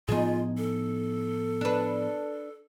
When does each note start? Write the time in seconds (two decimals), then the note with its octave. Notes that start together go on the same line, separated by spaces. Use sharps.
0.08 A2 F3 B3 D#4 F4 G#4
0.58 A4
1.61 D4 B4